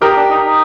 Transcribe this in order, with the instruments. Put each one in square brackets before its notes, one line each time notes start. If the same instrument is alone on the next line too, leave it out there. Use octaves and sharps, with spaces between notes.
[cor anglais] D#4 [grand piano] G4 A#4
[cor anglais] D4
D#4
D#4